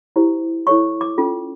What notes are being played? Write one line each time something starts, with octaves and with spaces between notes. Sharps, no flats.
E4 G4 C5
E4 A4 C#5 C#6
D6
C#4 F4 A4